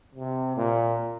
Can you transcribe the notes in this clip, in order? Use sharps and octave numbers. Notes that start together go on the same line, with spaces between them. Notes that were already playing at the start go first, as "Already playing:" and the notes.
C3
A#2